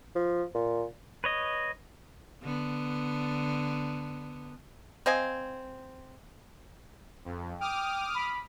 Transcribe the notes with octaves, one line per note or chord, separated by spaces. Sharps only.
F3
A#2
B4 C#5 D#5
D3 B3
C4 D#5 F5 G#5
F2
G5 D6 D#6 F6
B5